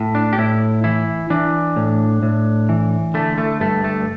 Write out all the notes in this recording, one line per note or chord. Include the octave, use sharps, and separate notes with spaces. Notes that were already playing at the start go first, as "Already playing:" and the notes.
Already playing: A2
D4
G4
A2 E4
E3 E4
E3 D4
A2
A2
E3
D3 A3
A3
G2 A3
A3